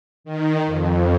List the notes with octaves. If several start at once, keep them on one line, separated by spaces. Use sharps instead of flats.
D#3
F2